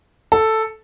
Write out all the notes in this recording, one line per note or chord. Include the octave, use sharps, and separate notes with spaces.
A4